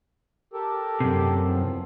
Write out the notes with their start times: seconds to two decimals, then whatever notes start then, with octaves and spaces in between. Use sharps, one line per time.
0.53 G4 A4 A#4
1.00 F#2 C3
1.45 E2 F3